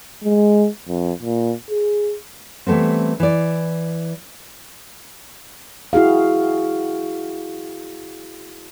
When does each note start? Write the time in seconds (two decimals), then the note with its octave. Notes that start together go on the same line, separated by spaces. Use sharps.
0.24 G#3
0.88 F2
1.22 A#2
1.71 G#4
2.67 E3 G3 A3 B3 C4
3.20 E3 D5
5.93 E4 F#4 G#4 F5